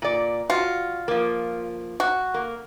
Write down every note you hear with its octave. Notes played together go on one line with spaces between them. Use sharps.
A#2 D5
F4 F#4
F3 A#3
F#4
A#3